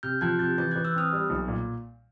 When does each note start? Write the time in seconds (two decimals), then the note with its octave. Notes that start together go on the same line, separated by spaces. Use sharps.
0.03 C3 F6 G6
0.21 F3 F#6 G#6
0.39 C3 G6 A6
0.58 E3 G6 A6
0.71 F#6 G#6
0.76 E3
0.85 E6 F#6
0.94 C4 D#6 F6
1.12 G3
1.30 B1
1.48 A#2